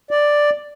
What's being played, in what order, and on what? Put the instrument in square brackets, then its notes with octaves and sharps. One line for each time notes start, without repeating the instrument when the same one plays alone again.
[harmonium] D5